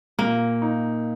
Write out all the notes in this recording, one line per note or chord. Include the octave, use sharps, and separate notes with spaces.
A#2 A#3
D#4